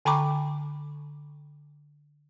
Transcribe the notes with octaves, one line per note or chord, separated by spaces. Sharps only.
D3 G5 A#5 B5 C#6 D6